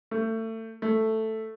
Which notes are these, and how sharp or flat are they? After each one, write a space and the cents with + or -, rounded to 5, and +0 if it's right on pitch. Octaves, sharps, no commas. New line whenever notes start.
A3 +30
A3 +5